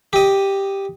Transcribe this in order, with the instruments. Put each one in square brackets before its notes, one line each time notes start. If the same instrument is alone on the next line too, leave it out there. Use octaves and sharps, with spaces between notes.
[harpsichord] G4 D#5